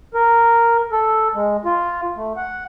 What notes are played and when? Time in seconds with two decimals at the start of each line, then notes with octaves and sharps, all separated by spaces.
0.14 A#4
0.92 A4
1.35 G#3
1.65 F4
2.16 A3
2.36 F#5